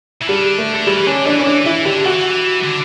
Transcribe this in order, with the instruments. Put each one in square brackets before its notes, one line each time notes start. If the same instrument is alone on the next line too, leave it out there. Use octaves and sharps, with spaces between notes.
[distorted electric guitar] E3
[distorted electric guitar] D3 [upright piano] G3
[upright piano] A3
[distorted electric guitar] D3
[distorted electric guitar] E3 [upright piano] G3
[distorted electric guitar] E3
[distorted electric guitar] D3 [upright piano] C#4
[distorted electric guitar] E3 [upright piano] D4
[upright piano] C#4
[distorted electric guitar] E3 [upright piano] D4
[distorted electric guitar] E3 [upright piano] E4
[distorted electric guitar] D3 [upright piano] G4
[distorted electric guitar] E3 [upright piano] F#4
[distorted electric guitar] D3